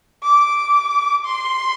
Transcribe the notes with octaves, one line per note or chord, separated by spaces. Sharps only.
D6
C6